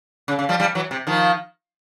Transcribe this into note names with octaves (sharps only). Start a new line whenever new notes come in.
C#3
C#3
F3 G3
F3 G3
E3 F#3
C3
D#3 F3